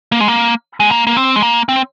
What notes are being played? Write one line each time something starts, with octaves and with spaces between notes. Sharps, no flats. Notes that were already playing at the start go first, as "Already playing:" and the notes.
A#3
G#3
A#3
G#3
A#3
A#3
C4
G#3
A#3
C4